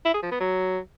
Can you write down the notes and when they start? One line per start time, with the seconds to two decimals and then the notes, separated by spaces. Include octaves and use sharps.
0.05 E4
0.14 G#4
0.23 F3
0.31 B3
0.40 F#3